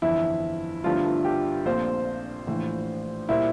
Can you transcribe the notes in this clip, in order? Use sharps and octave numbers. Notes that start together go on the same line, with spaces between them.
G1 F2 E3 E4
G1 G2 F3 A3 D4 F4
G4
A#1 A#2 A3 C4 F4 C5
A#1 A2 E3
A#2 G3 A#3 E4 F4 C5